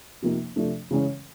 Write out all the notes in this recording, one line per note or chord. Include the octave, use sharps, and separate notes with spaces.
C3 F3 A#3 D#4
C3 F3 A3 D4
C#3 E3 G#3 C#4